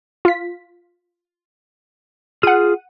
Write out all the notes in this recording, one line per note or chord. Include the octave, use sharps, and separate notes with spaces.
F4 B6
F4 G#4 F#5 F6 D#7